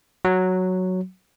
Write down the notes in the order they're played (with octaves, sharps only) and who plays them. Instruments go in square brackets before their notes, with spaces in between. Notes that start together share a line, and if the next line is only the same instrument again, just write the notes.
[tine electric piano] F#3